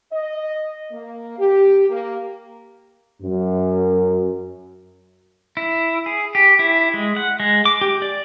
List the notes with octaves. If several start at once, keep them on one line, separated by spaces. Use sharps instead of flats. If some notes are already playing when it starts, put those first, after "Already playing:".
D#5
A#3
G4
A#3
F#2
E4
G#4
G4
E4
G#3
F#5
G#3
D6
G4
D5